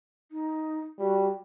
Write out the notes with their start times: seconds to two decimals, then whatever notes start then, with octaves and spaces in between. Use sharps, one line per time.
0.31 D#4
0.99 G3 F#4